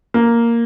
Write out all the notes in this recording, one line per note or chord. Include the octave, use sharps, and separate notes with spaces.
A#3